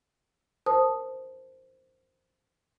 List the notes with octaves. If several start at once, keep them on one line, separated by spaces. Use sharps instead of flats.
A#4 C5 A5 D#6